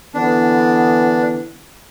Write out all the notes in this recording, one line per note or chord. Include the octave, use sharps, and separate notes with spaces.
D3 E3 B3 D4